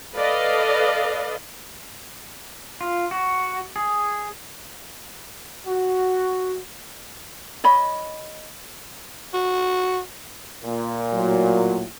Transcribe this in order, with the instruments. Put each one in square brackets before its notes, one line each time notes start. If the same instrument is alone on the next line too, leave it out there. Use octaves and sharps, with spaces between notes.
[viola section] A4 B4 D5 D#5 F5
[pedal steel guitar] F4
F#4
G#4
[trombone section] F#4
[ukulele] C#5 D#5 B5
[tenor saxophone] F#4
[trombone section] A#2
[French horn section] A2 F#3